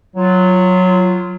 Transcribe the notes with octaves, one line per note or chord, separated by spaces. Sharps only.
F#3 F4